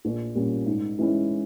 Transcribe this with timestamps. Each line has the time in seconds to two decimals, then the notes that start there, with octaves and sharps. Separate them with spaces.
0.05 A#1
0.35 A#2 G3 A#3 C#4
0.66 G#2
0.99 E3 G#3 C#4 E4